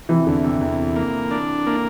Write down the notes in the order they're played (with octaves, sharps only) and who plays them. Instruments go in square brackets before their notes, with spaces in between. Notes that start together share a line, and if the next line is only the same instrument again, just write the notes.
[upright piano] C3 E3
[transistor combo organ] E2 [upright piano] D3
[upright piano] C3
[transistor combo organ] E2 [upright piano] C3
[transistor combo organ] A#3
D4
A#3